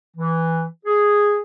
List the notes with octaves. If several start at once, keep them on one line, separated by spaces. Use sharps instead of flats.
E3
G#4